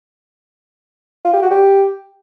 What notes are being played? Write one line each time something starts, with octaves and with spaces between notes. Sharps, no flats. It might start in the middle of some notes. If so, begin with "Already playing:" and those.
F4
G4
F#4
G4